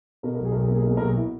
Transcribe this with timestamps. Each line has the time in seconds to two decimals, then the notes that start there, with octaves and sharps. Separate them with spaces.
0.23 B2 A#4
0.35 A#4
0.40 B1
0.45 G#4
0.52 B1 A#4
0.59 G#4
0.67 A#4
0.70 A#3 G#4
0.82 A#4
0.87 B2 G#4
0.97 A#4
1.02 B1 G#4
1.17 E4